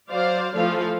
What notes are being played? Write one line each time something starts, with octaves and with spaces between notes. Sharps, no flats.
F#3 C5 D5 F5
E3 F3 A3 A4 F5